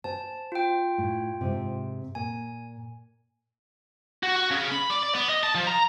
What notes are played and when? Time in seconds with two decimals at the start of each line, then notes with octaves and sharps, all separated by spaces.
0.04 C5 G#5 A5
0.52 F4 G5
0.98 A2
1.41 G#2 C3
2.15 A#2 G#5
4.23 F#4
4.36 F#4
4.51 C#3
4.72 B5
4.90 D5
5.03 D5
5.15 B3
5.29 D#5
5.43 A5
5.55 F3
5.67 A#5